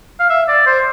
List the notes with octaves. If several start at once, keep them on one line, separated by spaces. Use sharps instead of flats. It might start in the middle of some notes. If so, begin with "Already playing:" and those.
F5
E5
D5
C5